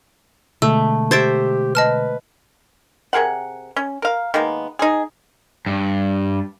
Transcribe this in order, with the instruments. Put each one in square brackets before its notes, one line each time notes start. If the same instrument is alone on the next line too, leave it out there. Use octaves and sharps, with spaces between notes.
[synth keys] B2 D3 G#3 [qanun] A3 [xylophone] E6
[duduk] G4 [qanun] C5 E5 [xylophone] G#6 A6 D7
[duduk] B4 [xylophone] D#5 A5 F6
[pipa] C3 G#4 A#4 F#5
C#4
A#4 F5
D#3 G#3 A#3 B3
D#4 G#4
[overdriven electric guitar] G2